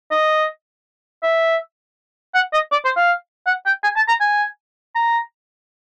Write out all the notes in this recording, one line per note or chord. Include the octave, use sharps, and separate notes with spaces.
D#5
E5
F#5
D#5
D5
C5
F5
F#5
G5
G#5
A5
A#5
G#5
A#5